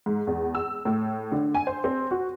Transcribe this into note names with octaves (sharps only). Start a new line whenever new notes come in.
G#2
E2
E6
A2
D3
G#5
C5
C4
F#4